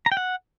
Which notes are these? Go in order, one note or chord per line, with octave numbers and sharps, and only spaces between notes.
A#5
G5
F#5